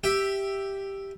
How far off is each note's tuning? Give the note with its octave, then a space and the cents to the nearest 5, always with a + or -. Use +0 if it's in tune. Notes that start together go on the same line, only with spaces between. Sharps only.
G4 +0 E5 +0